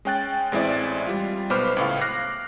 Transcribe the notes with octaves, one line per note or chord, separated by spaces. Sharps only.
G#3 C#4 G5 F#6 A6
A1 G#3 C4 E4 D5
G3 F4
B1 B3 C5 B5 D6 F6
C#2 A2 F5
D6 F6 F#6 A#6 C7